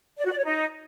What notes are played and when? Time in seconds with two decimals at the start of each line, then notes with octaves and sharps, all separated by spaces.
0.18 D5
0.25 F#4
0.31 D5
0.38 C#5
0.44 D#4